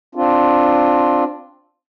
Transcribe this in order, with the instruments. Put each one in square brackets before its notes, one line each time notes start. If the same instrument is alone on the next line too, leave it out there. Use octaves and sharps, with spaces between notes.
[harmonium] C4 D4 F4